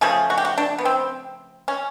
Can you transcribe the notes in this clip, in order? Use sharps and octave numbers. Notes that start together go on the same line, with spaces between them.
C#3 F3 A3 G#4
F#4
G4
F#4
D4
B3
C4
C#4